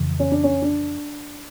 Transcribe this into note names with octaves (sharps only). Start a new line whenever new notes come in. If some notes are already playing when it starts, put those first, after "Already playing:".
Already playing: F2 C#3 E3
C#4
D4
C#4
D4